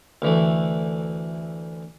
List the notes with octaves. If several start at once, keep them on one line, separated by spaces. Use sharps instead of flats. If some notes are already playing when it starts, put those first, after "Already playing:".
D2 E3 A3